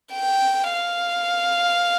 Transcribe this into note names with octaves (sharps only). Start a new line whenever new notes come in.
G5
F5